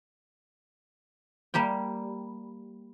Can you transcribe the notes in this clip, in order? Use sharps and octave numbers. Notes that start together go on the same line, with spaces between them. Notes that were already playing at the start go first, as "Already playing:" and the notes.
G3 A#3 G4 G5